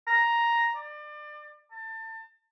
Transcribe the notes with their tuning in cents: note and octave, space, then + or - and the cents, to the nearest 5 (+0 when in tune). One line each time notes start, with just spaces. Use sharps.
A#5 +5
D5 +30
A5 +30